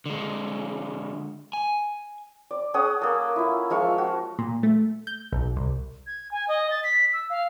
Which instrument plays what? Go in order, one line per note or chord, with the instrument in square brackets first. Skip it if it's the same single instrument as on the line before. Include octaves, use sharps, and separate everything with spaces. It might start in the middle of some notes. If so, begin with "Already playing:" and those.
[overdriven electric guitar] D3 G#3
G#5
[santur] D5
C#4 G#4 F#5 D#6
A#3 A4
E4 F4
F3 G#3 F5 C#6
F#4
[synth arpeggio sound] A#2
A3
G6
B1
C2
[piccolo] G#6
G#5
D#5
A6
B6
E6
F5